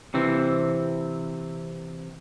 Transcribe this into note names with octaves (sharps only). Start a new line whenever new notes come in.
C3 E3 C4